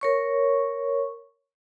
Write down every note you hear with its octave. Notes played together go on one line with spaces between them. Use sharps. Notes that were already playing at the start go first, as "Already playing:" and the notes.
A#4 C#5 C#6